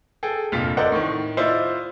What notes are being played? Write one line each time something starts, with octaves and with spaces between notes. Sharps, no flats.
G#4 A4 G5
F1 G2 A#2 F4 B6
A4 A#4 C5 D5 D#5 F#5
A2 D#3
E4 F4 C5 D5 D#5